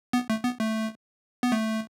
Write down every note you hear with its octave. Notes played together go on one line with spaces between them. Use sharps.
B3
A3
B3
A3
B3
A3